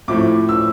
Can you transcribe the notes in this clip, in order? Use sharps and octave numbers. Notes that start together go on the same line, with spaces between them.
A2 F3 A3 C4 E4 D6
E6